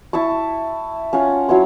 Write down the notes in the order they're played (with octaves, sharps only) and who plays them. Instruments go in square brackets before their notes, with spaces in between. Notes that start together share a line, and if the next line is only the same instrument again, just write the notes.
[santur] E4 E5 A5 C#6
C#4 F4 C#5 F#5
F#3 E4 C#5 C6